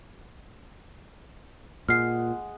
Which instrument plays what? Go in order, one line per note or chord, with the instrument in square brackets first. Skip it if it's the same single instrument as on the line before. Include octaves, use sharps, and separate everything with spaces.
[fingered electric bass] A#2 [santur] G#3 F#5 [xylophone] F6 C7